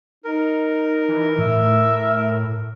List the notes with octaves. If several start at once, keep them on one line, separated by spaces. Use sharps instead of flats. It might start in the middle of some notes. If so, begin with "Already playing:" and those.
D#4 A#4
E3
A2 E5